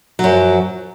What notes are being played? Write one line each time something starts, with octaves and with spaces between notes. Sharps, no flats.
F#2 F3 F#3